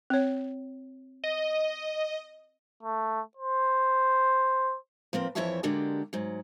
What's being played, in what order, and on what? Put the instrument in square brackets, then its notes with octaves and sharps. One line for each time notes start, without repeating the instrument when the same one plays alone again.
[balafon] C4 C#5
[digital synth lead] D#5
[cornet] A3
C5
[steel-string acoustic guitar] F3 A#3 C4 B4
F2 E3 F3 C#5 E5 A5
D3 G#3 A#3 D4 F#4 G4
G#2 F#3